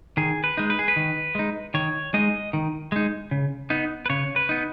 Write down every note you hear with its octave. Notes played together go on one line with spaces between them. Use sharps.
D#3 G#4
B4
G#3 D#4
B4
G#4
B4
D#3
G#3 D#4
D#3 C#5
G#3 D#4 D#5
D#3
G#3 D#4
C#3
B3 D#4
B4
C#3 C#5
B4
B3 D#4